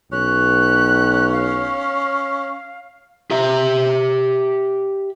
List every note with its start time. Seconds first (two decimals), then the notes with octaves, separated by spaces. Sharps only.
0.12 B1 C#4 F#6
1.33 F5
3.31 G4 E5